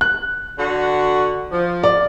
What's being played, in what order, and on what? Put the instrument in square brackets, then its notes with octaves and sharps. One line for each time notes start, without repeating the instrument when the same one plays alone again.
[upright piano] F#6
[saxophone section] D3 F#4
F3
[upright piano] D5